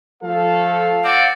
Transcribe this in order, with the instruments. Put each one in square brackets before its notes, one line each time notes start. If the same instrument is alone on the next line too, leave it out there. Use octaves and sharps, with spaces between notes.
[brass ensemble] F3 A3 A4 [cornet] F5
[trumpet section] C4 D5 [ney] F#5